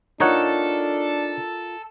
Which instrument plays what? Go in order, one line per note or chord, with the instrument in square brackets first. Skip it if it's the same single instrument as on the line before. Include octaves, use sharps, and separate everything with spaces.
[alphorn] D4 [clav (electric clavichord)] D#4 C#5 F#5 [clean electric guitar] F4 A#4 [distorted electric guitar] A4